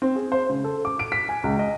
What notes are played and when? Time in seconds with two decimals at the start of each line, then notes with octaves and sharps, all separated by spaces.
0.02 C4
0.16 G#4
0.32 C5
0.50 C#3
0.64 A4
0.85 D6
0.99 D7
1.12 B6
1.29 G#5
1.44 C#2
1.59 D#5